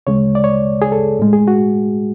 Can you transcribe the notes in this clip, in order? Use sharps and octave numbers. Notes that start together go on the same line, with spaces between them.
D2 C#3 G#3 C#5
D5
C#5
G#4
A4
A2 G#3
G#4
F#4